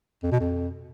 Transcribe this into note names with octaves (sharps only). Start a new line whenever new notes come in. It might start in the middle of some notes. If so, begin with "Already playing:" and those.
F2
B2
F2